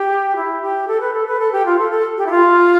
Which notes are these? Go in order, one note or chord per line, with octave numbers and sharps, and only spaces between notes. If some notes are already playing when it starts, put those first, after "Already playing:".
Already playing: G4
E4
G4
A4
B4
A4
B4
A4
G4
F4
A4
A4
G4
E4
F4